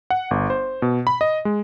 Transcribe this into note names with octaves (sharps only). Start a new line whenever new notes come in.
F#5
G1
C5
B2
B5
D#5
G#3